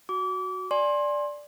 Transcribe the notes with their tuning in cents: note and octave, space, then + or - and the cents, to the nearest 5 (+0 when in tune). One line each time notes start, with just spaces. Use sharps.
F#4 +0 D6 -30
D5 +0 G#5 +0 C6 +25